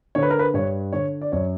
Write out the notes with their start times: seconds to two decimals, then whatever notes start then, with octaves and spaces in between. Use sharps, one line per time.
0.15 D3 C#5
0.23 B4
0.30 A#4
0.39 B4
0.54 G2 C#5
0.93 D3 C#5
1.21 D5
1.32 F#2 C#5